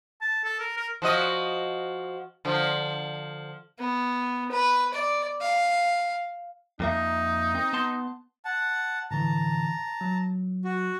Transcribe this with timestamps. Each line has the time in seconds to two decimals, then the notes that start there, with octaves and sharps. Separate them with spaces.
0.21 A5
0.44 A4
0.59 A#4
0.77 A#4
1.02 F3 F#4 D#5
2.45 D3 F3
3.79 B3
4.52 B4
4.94 D5
5.41 F5
6.80 F2 A#3 D#4 E5
7.55 C4
7.73 B3 A5 C6
8.45 F#5 A5
9.11 A2 D3 E3 A5 A#5
10.01 F#3
10.64 F#4